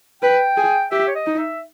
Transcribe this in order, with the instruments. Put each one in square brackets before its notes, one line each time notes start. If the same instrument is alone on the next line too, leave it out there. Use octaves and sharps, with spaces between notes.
[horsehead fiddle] B4 [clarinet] G5
[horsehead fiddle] G#4
[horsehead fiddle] G4 [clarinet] E5
[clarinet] C#5
D#5
[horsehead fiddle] D#4
[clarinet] E5